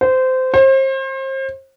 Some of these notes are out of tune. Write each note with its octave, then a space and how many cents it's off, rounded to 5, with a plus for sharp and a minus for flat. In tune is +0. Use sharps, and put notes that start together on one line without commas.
C5 -20
C5 +35